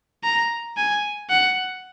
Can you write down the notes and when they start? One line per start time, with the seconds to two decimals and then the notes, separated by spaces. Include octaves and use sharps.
0.24 A#5
0.77 G#5
1.29 F#5